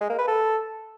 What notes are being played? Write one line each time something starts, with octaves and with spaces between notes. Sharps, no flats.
G#3
A#3
B4
A4